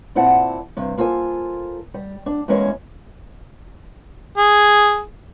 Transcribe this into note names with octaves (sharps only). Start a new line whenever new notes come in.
A#2 C4 E4 D5 F#5 A5
G2 C3
A#3 F4 A4 C5 G#5
G3
D4
E2 G#3 A#3 C#4 G#5
G#4